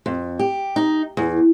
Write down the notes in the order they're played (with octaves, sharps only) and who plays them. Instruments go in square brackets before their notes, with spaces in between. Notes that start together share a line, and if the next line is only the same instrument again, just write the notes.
[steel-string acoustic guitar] F2
G4
D#4
E2